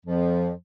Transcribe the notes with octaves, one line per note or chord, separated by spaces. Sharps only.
F2 F3